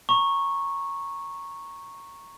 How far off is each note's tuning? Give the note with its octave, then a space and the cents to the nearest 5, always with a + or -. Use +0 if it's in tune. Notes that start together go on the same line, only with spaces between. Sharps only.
A#5 +0 C#6 -10